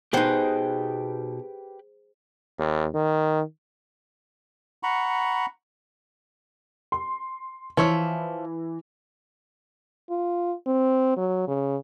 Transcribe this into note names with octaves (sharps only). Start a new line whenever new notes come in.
B2 D#4 G4 G#4 B4 C5 F#5 G5
D#2
D#3
F#5 A#5 B5 C#6
C6
E3 F3 C#5 E5
F4
C4
F#3
C#3